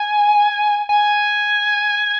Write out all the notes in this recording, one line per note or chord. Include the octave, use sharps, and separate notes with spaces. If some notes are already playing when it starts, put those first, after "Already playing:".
Already playing: G#5
G#5